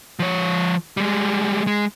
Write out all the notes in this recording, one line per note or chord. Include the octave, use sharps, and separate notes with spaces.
F3 C#5
G3 G#3
G#3